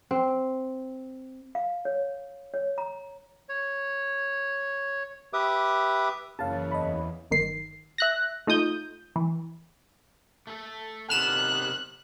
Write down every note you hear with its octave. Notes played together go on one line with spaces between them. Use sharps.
C4
F5
C#5
C#5
A#5
C#5
G4 B4 E5 D6 D#6
F#1 E3 C#5 F5 A5
E2 D#5 B5
G1 D#3 C7
E5 F#6 A#6
A3 D#4 F4 D#6 G6
E3
A3 A4
C3 D#3 B3 F6 F#6 E7